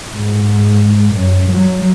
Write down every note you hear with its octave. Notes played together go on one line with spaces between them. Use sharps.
G#2
F#2
F#3